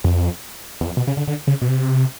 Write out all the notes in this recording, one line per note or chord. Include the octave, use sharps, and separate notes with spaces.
F2
E2
F2
B2
C#3
D3
D3
C#3
B2
C3